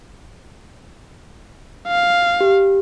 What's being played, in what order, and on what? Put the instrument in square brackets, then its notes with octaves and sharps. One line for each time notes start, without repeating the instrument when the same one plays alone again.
[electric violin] F5
[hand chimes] G4